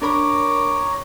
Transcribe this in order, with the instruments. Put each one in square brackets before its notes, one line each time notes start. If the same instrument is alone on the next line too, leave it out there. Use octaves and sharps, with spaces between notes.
[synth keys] D4 A#4 B5 [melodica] C#5 A#5 [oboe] D6